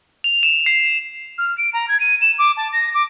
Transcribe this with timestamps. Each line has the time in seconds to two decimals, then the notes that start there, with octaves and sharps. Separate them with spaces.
0.24 F7
0.43 E7
0.66 C7
1.38 F6
1.57 D7
1.73 A#5
1.88 G#6
2.00 D#7
2.21 E7
2.38 D6
2.56 A5
2.72 A#6
2.94 D6